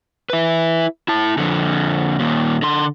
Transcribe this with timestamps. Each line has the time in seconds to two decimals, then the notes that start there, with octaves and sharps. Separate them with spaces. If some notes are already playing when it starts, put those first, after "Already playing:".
0.30 E4 B4
1.08 E4 A5
1.38 F2 D3
2.19 D#2 A#2
2.62 D3 C6